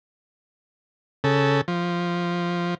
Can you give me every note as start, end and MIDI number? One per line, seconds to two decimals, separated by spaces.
1.24 1.61 49
1.24 1.61 69
1.68 2.75 53